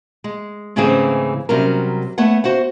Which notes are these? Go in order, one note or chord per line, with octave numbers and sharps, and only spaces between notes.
G#3
G#2 C#3 E3 A3 C4 G#4
C3 F#3 G3 C#4 A#4
A3 B3 C#5 F#5
F#4 C5 F#5